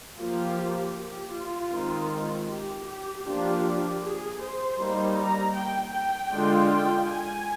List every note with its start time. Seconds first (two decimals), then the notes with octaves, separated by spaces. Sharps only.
0.18 F3 A#3 F4 G4
0.95 G4
1.33 F4
1.72 D#3 G#3 C4 D#4
2.49 G4
2.87 G4
3.25 F3 A#3 D4 F4 G4
4.02 G#4
4.41 C5
4.79 G3 A#3 D#4
5.18 A#5
5.55 G5
5.94 G5
6.33 D3 G#3 D4 F4
6.71 G5
7.09 G#5